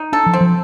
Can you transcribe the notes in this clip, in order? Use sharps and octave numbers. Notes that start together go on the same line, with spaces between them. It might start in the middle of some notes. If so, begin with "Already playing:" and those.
Already playing: D#4
D4 A4
F3
C4
F3